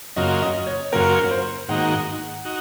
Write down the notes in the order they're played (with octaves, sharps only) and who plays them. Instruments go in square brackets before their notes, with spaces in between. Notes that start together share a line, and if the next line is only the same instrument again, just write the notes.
[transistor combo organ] F#2 C#3 F#3 A#3 F4 [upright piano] D#5
[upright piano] D#5
C#5
[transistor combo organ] F#2 C#3 F#3 A#3 F4 [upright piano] A#4
[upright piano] C5
[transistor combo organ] G#2 D#3 A#3 D#4 F#4 [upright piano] F#5
[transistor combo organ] D#4 F#4